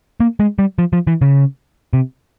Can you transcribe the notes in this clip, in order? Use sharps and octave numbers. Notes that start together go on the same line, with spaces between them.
A#3
G#3
G3
F3
F3
E3
C#3
C3